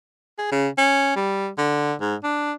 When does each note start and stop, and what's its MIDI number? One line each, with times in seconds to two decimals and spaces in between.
0.38 0.50 68
0.52 0.69 49
0.78 1.13 61
1.16 1.48 55
1.58 1.94 50
2.01 2.15 44
2.23 2.52 62